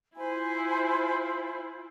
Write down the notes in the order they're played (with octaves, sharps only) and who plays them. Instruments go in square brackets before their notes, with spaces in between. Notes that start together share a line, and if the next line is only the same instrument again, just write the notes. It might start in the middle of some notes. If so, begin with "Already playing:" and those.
[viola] E4 F4 [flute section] C5 G#5 B5